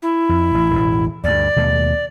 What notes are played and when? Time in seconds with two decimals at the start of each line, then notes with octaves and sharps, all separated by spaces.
0.02 E4
0.29 F2
0.54 A1
0.70 E1 A1
1.24 D2 G2 D5
1.56 D#2 B2 A3